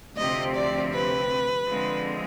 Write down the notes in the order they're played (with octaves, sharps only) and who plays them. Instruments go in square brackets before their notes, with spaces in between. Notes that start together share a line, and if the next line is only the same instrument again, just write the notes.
[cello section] D2 C3 F3 C4 G4 [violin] D#5
[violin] D5
B4
[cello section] D3 F3 G#3 C4